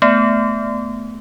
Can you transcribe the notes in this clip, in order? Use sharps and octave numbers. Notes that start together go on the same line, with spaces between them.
A3 B3